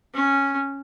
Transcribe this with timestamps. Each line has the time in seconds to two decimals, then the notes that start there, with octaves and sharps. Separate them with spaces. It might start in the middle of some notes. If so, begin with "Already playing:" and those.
0.15 C#4